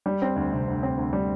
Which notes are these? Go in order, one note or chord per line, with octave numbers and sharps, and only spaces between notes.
G3
C4
D2
C3
D2
C4
D2
G3